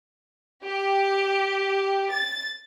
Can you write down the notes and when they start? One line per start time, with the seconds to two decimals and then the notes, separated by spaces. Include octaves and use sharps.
0.63 G4
2.10 A6